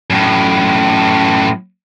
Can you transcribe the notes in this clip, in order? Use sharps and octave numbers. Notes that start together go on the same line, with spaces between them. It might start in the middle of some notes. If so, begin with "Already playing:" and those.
F#2 A2